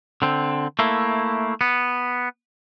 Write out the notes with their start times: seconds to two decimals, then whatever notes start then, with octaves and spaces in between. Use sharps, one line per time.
0.22 D3 C4
0.79 A3 A#3 E4
1.61 B3